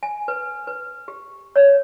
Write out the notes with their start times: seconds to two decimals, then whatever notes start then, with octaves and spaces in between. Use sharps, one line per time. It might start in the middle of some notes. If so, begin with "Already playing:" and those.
0.03 G#5
0.28 B4
0.67 B4
1.08 G4
1.56 C#5